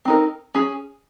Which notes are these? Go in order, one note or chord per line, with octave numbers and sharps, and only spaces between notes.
C4 D#4 A#4
C#4 G#4